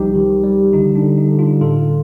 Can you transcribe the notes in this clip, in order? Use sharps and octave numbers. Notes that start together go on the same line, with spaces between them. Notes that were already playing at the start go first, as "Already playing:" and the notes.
Already playing: C2 F3 G3 D#4 G4
D#3
G3
D3 D#4
D4
D3
D#4
D3
D4 F4
A2 F4 A4